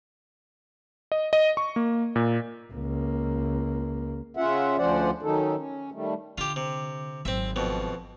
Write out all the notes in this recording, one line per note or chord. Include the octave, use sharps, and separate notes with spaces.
D#5
D#5
C#6
A#3
A#2
C#2 A#3
C#3 C#4 F4 E5 F#5
D2 F3 C#4 C5 D5 F#5
D#3 F#3 C#4 D#4 A4
C#4
D#3 G3 A3
D3 F4 G4
C3
G#1 F#3 C4 E5
F2 B2